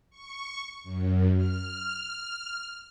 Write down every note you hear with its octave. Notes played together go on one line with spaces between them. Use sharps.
C#6
F#2
F6